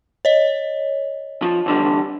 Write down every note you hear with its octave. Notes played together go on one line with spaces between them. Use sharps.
C#5 D#5
F3
E2 D3 G3